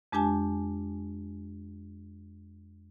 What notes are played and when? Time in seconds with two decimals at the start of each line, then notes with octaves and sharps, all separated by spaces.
0.12 F2 G#3 D4 G4 G#5 A5